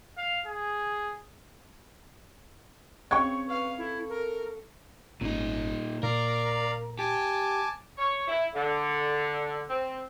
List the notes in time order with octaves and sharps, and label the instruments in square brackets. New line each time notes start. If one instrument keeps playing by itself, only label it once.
[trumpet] F5
G#4
[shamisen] C#3 G5 [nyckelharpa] C4 C#5 [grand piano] C#6 G#6
[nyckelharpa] B4 F5
[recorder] E4 [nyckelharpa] A4
[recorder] A#4
[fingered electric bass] G#1 C#4 [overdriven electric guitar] A#2 D#4
[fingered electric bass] A#2 [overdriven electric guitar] A#4 [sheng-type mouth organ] D5 F5 A#5
[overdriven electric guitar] G4 [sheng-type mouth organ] G#5 A5 D6
[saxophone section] C#5
E4
D3
C4